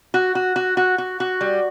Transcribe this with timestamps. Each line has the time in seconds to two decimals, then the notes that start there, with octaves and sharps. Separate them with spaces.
0.14 F#4
0.35 F#4
0.56 F#4
0.77 F#4
0.98 F#4
1.20 F#4
1.41 G3